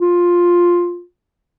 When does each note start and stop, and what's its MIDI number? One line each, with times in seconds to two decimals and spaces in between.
0.01 1.03 65